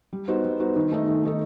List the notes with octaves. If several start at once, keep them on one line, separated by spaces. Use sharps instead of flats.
G3
B3 D#4 F#4 C5
G3
B3 D#4 F#4 C5
D#3
A3 D#4 A4 D#5
D#3
A3 D#4 A4 D#5